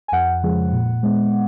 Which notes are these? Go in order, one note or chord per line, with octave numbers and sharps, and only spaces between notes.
G#5
F2 F#5
C#3 F3 G#3
A#2
G#3 B3